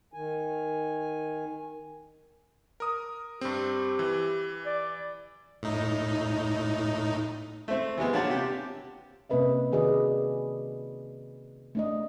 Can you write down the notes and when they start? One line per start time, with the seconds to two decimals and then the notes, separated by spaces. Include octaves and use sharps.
0.13 D#3 G#5
2.80 A#4 D#6
3.41 G2 C4 G4
3.99 E3
4.66 D5
5.63 A2 D#4
7.68 A3 C4
7.98 E3 G3 G#3 B3
8.13 A#3 D4 G4 C#5 F#5 A5
8.30 C3 G4
9.30 C3 A#3 C#4 B4 D#5 E5
9.72 D#3 F#4 G#4 B4 D5 D#5
11.75 A3 D4 D#5